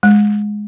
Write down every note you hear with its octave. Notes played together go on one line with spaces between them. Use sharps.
G#3